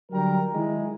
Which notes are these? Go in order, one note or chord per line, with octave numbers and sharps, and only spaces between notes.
D3 F#3 G3 A#4 G5 A#5
D#3 G#3 E4